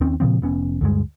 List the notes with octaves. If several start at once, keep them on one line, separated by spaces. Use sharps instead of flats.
D#2 D#3 C4 C#4
A#2 C#3 F3 C4
F1 B3 C#4
D2 G2 G#3